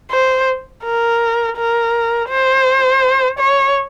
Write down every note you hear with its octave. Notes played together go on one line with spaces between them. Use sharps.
C5
A#4
A#4
C5
C#5